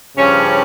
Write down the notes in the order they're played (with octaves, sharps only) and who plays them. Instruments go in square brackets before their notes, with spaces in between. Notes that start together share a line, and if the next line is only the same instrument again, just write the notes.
[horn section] G2 C#3 F3 C#4